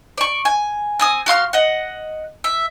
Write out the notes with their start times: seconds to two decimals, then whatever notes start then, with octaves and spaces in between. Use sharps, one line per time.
0.18 D5 C#6
0.45 G#5
0.99 C4 G#5 D#6
1.26 F#4 F5 C6 F6
1.53 D#5 F#5
2.44 E5